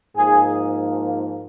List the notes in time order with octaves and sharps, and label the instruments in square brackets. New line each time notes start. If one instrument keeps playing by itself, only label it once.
[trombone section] G#2 F3 A#3 G#4